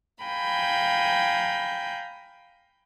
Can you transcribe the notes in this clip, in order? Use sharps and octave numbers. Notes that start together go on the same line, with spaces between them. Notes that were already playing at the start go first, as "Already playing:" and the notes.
F5 G5 G#5 A#5 B5 G6